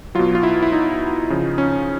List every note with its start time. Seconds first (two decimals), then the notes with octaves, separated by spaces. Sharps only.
0.15 B2 F#3 F4
0.35 F4
0.43 E4
0.62 E4
0.72 D#4
1.30 C#3 F3
1.58 C#4